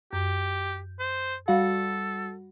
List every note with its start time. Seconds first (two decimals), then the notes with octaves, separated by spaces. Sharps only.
0.13 F#2 G4 G6
1.00 C5
1.48 G3 F#4 A4 F5 F#5